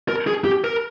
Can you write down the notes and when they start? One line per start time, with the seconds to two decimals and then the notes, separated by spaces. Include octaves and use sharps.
0.08 A#4
0.27 G#4
0.45 G4
0.64 A#4